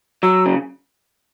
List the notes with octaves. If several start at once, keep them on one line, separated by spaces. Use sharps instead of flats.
F#3 E6
C#3